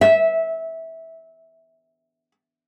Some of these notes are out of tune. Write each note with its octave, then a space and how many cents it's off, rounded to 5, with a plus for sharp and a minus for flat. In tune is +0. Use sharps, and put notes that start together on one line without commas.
E5 -15